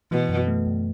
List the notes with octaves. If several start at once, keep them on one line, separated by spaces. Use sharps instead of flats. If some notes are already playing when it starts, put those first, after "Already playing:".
B2 E3
F#2
A3
F#2